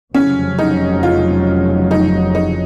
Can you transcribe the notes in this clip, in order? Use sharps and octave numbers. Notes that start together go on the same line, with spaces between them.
F1 F2 C#3 F#3 C#4
D#4
F4
D#4
D#4